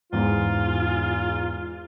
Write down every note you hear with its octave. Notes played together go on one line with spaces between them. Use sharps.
E2 G#2 F4